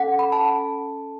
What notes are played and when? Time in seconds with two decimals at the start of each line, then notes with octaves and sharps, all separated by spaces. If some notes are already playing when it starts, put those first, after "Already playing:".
Already playing: C#4 A4 F#5
0.19 B5
0.32 A5